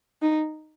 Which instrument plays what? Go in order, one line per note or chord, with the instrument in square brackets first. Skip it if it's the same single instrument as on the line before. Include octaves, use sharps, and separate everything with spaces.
[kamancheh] D#4